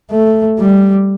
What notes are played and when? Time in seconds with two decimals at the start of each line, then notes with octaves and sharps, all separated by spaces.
0.11 A3
0.60 G3